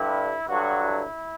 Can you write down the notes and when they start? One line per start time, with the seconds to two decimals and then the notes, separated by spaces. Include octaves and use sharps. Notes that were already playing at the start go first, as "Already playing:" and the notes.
Already playing: G2 D3 G3 E4
0.49 G2 D3 F#3 F#4
0.83 E4